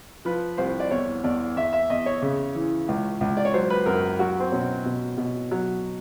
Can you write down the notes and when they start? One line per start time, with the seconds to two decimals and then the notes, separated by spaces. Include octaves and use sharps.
0.25 F3 B4
0.57 C2 C5
0.80 D5
0.91 E2 C#5
1.24 E2 D5
1.57 E2 E5
1.73 E5
1.90 E2 D#5
2.06 C#5
2.22 C#3
2.55 E3
2.88 C#2
3.21 C#2
3.37 D5
3.45 C#5
3.53 F#3 C5
3.70 B4
3.86 F#2 A#4
4.19 F#3 F#4
4.40 C4
4.52 B2 C#4
4.85 B2
5.17 B2
5.51 F#3